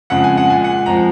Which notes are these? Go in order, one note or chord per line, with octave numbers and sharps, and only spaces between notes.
F2 C#3 G#3 F#5
G#5
F#5
A#2 G#3 G#5
F#5
F2 F3 G#3 A#5